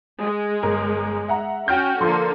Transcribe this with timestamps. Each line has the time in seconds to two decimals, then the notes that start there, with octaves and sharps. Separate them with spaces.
0.22 G#3
0.63 G1 A#4
1.28 E5 F#5 A#5
1.68 C#4 F#4 G5 F6 G6
2.01 D3 F3 A#3 A4 C6